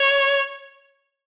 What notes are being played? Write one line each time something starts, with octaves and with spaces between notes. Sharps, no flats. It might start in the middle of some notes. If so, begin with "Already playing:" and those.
Already playing: C#5